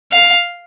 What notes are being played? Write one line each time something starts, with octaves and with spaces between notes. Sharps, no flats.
F5